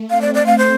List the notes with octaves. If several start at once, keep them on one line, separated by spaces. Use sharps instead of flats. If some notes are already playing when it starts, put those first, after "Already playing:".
Already playing: A3
C4 F5
D5
D5
F5
C5